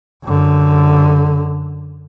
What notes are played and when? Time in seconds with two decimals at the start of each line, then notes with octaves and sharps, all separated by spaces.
0.24 F#2 D3